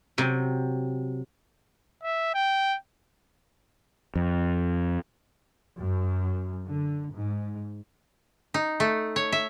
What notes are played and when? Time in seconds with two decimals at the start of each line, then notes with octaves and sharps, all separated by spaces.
0.18 C3 F#3
2.03 E5
2.34 G5
4.16 F2
5.78 F#2
6.65 D3
7.13 G#2
8.54 D#4
8.80 A3
9.16 C#5
9.32 E5